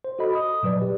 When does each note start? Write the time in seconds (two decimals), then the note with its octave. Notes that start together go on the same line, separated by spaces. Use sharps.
0.04 C5
0.19 F#4 A4 D#5 B5
0.33 D#5 D#6
0.63 A#2 F#3 B4 D5
0.82 G4